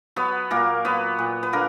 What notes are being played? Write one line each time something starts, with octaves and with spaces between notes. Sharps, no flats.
F#3 B3 B4
A#2 A#3 A#4
F#3 B3 B4
A#2
B4
D3 A#3 A#4